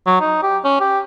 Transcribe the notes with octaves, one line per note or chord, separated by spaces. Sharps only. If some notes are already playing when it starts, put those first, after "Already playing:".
F#3
D#4
G4
C#4
G4